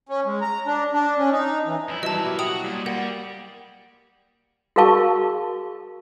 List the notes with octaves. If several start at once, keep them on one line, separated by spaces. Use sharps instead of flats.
C#4
G#3
A#5
D4
D4
C#4
D#4
E3
F2 E4 A#6
E3 F#3 G3 E4 A#4 D#5 E5 A5
B2 E4 G4
F#4 G5 D#6 F7
A#2 G3
A#3 G4 D5 F#5
F#4 G#4 A#4 F5 A5 C#6